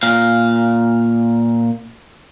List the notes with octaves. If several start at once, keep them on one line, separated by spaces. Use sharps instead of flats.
A#2 F5